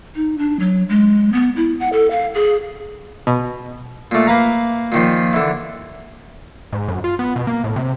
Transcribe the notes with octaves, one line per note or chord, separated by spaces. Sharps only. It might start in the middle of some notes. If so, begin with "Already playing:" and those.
D#4
D4
F#3
G#3
B3
E4
F#5
A4
F5
G#4
B2
A#2 A3
A#3 B4 F5 A#5
A#2 D#3 F3
D3 E3
G#2
F#2
F4
B3
B2
A#3
A2
C3